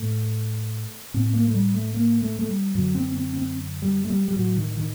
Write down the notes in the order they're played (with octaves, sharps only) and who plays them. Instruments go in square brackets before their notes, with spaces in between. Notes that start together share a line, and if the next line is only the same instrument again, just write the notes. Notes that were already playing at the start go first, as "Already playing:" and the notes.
Already playing: [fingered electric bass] A2 A3
A2 C4
A#3
A3
G3
A3
A#3
A3
A3
G3
F#2 D3 F#3
C4
C4
C4
G3
A3
G3
G3
A2 F#3
D#3
D#3